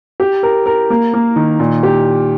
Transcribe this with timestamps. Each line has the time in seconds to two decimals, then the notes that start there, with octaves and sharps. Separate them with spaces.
0.20 G4
0.43 A#4
0.66 A#4
0.90 A#3
1.14 A#3
1.36 D#3
1.59 A#2
1.83 G4